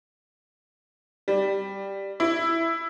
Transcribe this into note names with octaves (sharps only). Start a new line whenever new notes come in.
G3
E4